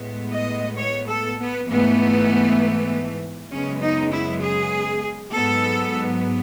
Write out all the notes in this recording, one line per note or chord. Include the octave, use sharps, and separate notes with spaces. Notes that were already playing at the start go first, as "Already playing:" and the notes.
Already playing: A2 G#3 B3
D#5
C#5
A4
B3
G#2 E3 A3 B3
F#2 C#3 G#3 B3 C#4
D#4
E4
G#4
G#2 F#3 B3 A4